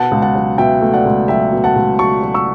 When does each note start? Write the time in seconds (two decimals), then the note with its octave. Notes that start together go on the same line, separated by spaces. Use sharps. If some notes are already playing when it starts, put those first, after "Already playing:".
Already playing: B2 F#5 A5
0.11 C#2
0.22 F#5 A5
0.35 F#3
0.58 B2 E5 G5
0.81 A3
0.94 D5 F#5
1.05 C#2
1.28 F#3 E5 G5
1.52 B2
1.64 F#5 A5
1.76 C#2
1.99 F#3 A5 C#6
2.22 F#3
2.34 C#6 E6